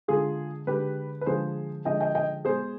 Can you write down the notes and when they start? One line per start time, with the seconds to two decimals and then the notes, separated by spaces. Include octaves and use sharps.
0.08 D3 G#3 F4 G#4
0.67 D3 G#3 G4 B4
1.21 B4
1.26 D3 F3 G#3 G#4 C5
1.85 D3 F3 G#3 D#5 G5
2.01 D#5 G5
2.15 D#5 G5
2.45 B2 G#3 G#4 C5